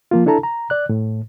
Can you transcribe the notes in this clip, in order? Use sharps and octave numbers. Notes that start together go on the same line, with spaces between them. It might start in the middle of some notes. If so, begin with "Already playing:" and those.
F3 A#3 F4
D4 E4 A4 A5 A#5
A#5
D5 F#6
A2